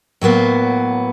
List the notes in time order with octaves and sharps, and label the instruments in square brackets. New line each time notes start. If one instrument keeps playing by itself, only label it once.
[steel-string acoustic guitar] A2 F#3 A#3 B3